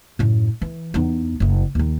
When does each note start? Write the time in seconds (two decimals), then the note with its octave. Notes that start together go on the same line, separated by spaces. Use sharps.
0.19 F#2 A2
0.62 E3
0.94 E2 D#4
1.40 F#1 E4
1.75 D#2 D#3